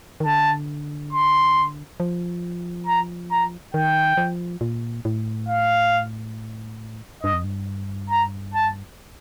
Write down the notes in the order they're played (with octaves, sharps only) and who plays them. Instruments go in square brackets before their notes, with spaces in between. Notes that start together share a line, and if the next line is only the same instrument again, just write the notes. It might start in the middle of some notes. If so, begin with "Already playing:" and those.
[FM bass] D#3
[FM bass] D3 [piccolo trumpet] A5
[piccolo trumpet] C6
[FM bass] F3
[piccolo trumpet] A#5
A#5
[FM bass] D#3 [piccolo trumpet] G5
[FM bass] F3
A#2
A2
[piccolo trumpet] F5
[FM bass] G2 [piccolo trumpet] D#5
[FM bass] F2
G2
[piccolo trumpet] A#5
A5